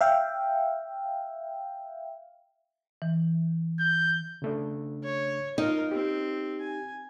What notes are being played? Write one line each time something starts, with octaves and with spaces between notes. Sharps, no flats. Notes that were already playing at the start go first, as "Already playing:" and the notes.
E5 F5 G5
E3
G6
C#3 A3 D4
C#5
D#4 F4 A#4
C4 G4
G#5